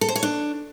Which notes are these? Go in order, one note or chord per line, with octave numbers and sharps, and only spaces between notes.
A4
C5
C#5
D4